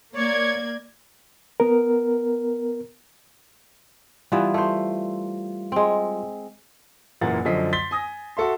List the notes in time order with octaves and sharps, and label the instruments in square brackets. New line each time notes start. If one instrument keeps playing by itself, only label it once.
[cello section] A#3 [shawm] C#5 [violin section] D5 G#6
[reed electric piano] B3 A#4
[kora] E3 B3 [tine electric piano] G3 F4
[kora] A3 C5
G#3 C4
[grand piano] F#1 A#2 E3 A#3 F#5 A6
F#2 D3 F3 D#5 B6 C7
C6 A6 B6 G7
G#5 D#6 A#6
F#4 A4 E5 C6